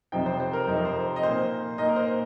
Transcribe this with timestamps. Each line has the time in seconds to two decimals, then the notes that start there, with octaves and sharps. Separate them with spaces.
0.12 F2 C3 F3 D#4 G5
0.26 C5
0.40 C5
0.53 A#4
0.67 F2 C3 F3 D#4 C5
0.76 A#4
0.85 C5
1.16 D#5
1.23 A#2 A#3 D#4 C5
1.78 A#2 A#3 D#4 D#5
1.89 A#4
1.96 C5